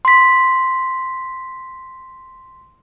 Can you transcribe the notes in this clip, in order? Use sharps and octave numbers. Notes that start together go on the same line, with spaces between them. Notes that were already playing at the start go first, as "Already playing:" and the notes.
C6 B6